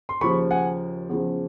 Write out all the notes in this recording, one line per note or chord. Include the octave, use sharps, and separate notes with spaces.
C6
D#2 C#3 F3 B5 C#6
F#5 G#5
E2 C#3 F3